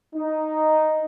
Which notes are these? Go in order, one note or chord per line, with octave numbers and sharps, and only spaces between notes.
D#4